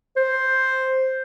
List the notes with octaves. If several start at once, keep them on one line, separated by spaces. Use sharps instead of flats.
C5